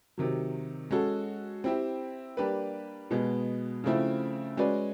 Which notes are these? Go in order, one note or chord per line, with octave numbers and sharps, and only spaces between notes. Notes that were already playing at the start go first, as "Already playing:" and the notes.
C3 D#3 F#3
G#3 C#4 F#4 A4
C4 E4 G4
G3 A#3 D4 G4 B4
B2 G#3 B3
C#3 F3 A3 C4 E4
G#3 C#4 F#4 B4 D5